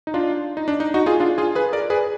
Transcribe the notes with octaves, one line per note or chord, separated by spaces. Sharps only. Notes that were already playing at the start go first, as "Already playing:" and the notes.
D#4
D4 F4
D#4
D4
D#4
D#4 F#4
F4 G#4
D4 F4
F4 G#4
G#4 B4
A#4 D5
G#4 B4